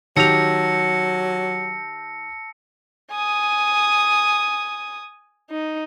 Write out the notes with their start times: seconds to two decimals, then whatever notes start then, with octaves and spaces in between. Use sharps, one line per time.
0.17 D#3 F#3 G4 A5 E6 A#6 C#7 F7
3.11 G#5 D#6
5.50 D#4